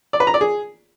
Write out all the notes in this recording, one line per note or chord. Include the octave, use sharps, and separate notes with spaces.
D5
B4
A#5
D5
G#4